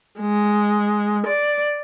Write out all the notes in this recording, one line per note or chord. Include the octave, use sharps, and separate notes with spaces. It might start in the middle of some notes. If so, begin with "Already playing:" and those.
G#3
D5